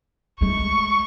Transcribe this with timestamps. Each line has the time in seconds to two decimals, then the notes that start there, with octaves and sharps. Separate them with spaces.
0.41 G#3 A3 C#6